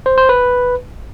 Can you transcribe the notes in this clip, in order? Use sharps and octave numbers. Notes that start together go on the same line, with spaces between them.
C5
C5
B4